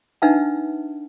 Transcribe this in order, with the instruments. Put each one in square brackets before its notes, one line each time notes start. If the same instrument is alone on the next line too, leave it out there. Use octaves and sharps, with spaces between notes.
[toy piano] D4 D#4 B4 E5 F#5 A5